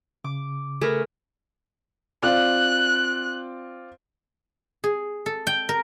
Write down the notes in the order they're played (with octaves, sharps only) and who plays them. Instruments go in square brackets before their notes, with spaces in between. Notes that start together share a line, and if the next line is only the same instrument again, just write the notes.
[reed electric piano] C#3 [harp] D6
[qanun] A3 [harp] G#4 A#4 B4
[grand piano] C4 F4 D5 [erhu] F#6
[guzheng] G#4
A4
G5
A#4